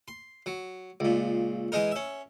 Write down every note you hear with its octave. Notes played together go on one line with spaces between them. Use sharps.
C6
F#3
C#2 A#2
E3 G#3 D#4 A#4
C#4 E5